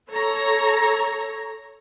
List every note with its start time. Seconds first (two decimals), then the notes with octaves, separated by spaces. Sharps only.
0.11 A4 C#5 A#5